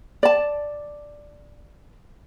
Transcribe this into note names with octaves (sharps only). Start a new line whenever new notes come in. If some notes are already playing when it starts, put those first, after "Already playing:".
D5 A5